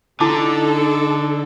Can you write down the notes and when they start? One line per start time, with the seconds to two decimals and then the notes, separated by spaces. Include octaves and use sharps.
0.20 D3 D#4 E4 A4 A5 D6